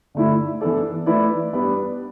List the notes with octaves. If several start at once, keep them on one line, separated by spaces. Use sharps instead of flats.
D3 A3 E4
E3 B3 D4 A4 D5
E3 A3 E4 B4 D5
G3 B3 D4 B4 D5